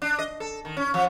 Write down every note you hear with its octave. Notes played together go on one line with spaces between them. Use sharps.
D4
D#5
A4
D#3
C#4
F3